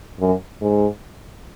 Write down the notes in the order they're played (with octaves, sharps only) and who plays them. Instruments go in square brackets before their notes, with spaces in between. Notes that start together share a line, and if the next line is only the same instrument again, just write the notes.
[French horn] F#2
G#2